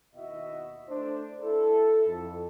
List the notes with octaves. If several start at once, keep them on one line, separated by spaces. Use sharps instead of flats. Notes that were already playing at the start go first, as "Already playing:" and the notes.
D#2 B2 E4 F#4 D#5 E5
A3 D4 C5
E4 A4
F2